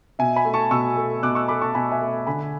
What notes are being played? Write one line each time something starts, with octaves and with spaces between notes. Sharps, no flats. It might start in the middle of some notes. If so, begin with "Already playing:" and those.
B2 E5 G#5
G#5 B5
A3
A5 C#6
B2 C#6 E6
A3
B2 D6 F#6
C#6 E6
A3 B5 D6
A5 C#6
B2 G#5 B5
E5 G#5
A3
D3 G#5 B5